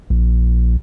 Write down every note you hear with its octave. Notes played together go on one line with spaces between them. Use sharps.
A#1